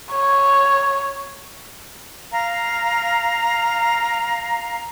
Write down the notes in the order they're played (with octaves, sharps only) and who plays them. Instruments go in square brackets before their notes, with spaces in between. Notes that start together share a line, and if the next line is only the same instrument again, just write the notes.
[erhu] C#5
[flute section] F5 A#5